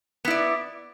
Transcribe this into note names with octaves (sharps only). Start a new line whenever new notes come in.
B3 E4 D5